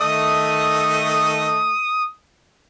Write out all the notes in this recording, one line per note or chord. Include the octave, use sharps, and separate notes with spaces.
D#3 A3 D#5 D#6